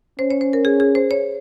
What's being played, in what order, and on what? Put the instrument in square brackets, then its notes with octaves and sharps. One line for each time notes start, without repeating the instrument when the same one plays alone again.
[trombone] C#4 [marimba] C5
[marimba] C#5
C5
A#4
G#4
G#4
C5
C#5